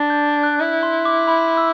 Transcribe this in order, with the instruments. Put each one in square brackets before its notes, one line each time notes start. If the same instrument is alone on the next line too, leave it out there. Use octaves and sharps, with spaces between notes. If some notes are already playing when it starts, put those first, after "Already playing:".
Already playing: [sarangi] D4
[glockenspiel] G6
F#6
[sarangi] E4
[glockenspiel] C6
D6
B5
E6